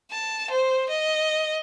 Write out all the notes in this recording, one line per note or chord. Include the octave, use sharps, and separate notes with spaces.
A5
C5
D#5